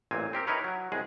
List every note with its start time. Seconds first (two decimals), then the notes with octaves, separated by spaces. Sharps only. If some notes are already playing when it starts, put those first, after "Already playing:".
0.11 A1 A#2 C4 G#5
0.33 C4 G4 A#4
0.47 D#4 E4 A#4 B4 C#5
0.64 F#3
0.92 C2 G#3 G#4